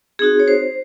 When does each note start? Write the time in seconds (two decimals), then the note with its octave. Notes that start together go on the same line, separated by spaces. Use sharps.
0.19 C4 D#4 F#4 G#4
0.39 C#5
0.48 C5